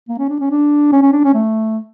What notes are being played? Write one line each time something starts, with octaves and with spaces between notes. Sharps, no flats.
A#3
C#4
D4
C#4
D4
C#4
C#4
D4
C#4
A3